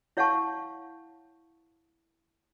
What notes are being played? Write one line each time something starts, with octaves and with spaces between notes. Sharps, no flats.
E4 C#5 F5 F#5 A5 C#6